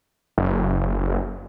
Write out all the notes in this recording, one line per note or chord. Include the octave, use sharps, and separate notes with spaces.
F#1